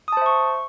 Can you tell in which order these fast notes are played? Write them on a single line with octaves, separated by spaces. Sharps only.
D#6 A5 C5 E5 C#6